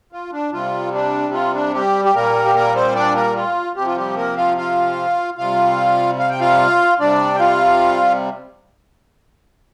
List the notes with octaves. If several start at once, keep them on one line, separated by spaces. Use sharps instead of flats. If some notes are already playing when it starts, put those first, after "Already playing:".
F4
D4
C3 G3 F4
D4
F4
D4
G3 G4
G4
A#2 G3 A#3 A#4
G4
A#3 A#4
C4 C5
D4 D5
A#3 A#4
F4
C3 F3 G4
F4
G3 G4
A#3 A#4
F4 F5
F4 F5
C3 G3 F4 F5
F5
G5
F4 F5
C3 G3 D4 D5
G5
F4 F5